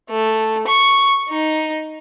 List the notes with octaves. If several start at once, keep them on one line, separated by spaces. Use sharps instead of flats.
A3
C#6
D#4